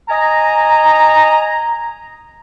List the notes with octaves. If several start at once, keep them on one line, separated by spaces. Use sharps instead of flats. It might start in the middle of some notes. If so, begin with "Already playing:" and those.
D#5 G#5 A#5